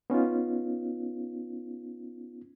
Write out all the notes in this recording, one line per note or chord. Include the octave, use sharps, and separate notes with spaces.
B3 C#4 D#4 F4